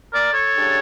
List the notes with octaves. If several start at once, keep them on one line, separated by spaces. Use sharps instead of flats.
A#4 D5
A4 C#5
C#3 G3 D4